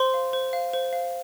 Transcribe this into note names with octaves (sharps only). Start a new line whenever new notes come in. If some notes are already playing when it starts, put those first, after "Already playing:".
Already playing: C5 C6
F5
C5
F5
C5
F5